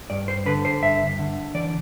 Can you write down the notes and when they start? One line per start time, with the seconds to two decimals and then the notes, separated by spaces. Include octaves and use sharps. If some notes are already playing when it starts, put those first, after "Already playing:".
0.10 G2 D5
0.28 C5
0.46 D3 B4
0.65 C5
0.82 G2 E5
1.19 D3
1.55 E3 D5